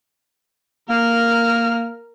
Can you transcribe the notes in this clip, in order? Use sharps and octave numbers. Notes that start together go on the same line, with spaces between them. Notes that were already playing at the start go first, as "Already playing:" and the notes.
A#3 A#4 F6